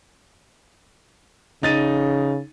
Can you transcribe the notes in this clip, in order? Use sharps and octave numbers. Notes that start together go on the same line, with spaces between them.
C#3 D#4 A6 D#7